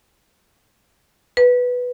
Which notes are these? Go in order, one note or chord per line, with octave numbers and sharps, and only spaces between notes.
B4